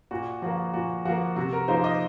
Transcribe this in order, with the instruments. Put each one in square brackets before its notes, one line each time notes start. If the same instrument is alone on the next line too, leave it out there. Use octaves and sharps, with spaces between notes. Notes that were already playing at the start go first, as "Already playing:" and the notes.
[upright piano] A#2 F#4
F3 A#3 F#4
A#2 F#4
F3 A#3 F#4
C3 F#4
A#4
F3 A#3 D#4 C5
D#5